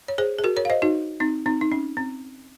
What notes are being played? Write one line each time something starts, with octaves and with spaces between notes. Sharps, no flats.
C#5
G#4 C5
G#4
F#4 A#4
A#4 C#5
F5
C5 D#5
D#4 F#4
C4 D#4
C4 D#4
D#4
C#4
C4